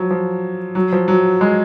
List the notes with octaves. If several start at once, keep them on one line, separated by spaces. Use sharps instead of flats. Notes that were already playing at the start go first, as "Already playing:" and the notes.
Already playing: F3 F#3
F3
F#3
F3
F#3
G#3